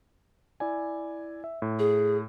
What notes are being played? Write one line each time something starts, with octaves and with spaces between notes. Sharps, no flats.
E4 D5 G#5
E5
A2
G#4